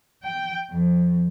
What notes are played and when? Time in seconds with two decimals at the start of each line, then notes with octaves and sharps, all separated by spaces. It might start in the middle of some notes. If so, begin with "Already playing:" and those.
0.24 G5
0.71 F2